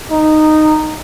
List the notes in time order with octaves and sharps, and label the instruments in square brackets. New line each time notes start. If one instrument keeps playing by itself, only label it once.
[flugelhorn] D#4